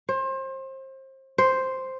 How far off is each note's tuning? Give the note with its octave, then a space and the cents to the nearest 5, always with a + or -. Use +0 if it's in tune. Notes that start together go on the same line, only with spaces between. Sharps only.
C5 +30
C5 +0